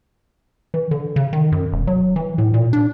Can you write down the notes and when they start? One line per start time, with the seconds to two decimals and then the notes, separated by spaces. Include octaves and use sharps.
0.74 E3
0.91 D3
1.16 C#3
1.33 D#3
1.52 F#2
1.72 E1
1.87 F#3
2.16 E3
2.38 A2
2.54 A#2
2.73 D4